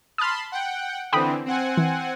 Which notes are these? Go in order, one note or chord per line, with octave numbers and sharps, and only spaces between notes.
A5 B5 C6 D#6 F6
F#5 G5
D3 E3 C4 G5 B5 D#6
C4 F#5 G#5
E3